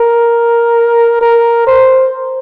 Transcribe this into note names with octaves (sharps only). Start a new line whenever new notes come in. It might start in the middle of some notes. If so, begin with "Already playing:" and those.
Already playing: A#4
A#4
C5